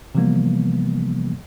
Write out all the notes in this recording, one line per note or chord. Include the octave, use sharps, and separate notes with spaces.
C3 E3 F3 G3 A#3 B3